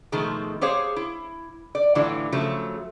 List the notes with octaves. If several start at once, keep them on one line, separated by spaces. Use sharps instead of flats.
B2 D#3 F3 G#3 A3
G4 G#4 C5 C#5 F5
E4
D5
A2 D3 E3 F#3 F4
C#3 F3 F#3 A3